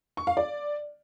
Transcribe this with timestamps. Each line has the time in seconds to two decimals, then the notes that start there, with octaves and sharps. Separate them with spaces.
0.17 C#6
0.27 F5
0.37 D5